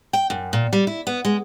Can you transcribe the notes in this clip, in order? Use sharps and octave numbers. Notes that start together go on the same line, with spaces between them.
G5
F#2
A#2
G3
E4
B3
G#3